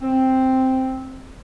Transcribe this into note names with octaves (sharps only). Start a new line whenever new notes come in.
C4